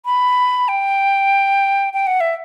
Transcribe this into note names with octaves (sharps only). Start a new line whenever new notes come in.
B5
G5
G5
F#5
E5